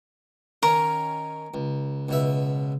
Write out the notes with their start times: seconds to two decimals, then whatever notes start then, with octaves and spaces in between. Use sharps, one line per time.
0.63 D#3 C#4 A#4
1.54 C#2
2.09 C#2 B2 E5